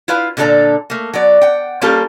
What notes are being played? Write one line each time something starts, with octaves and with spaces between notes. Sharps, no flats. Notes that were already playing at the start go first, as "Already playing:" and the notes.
E4 F4 B4 F5
A#2 D3 D4 A4 D5 A#5
A3 A#3
F#3 B3 D5
F#5 G5
G3 A#3 C#4 F4 G4 A4